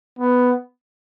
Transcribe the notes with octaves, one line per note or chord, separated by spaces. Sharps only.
B3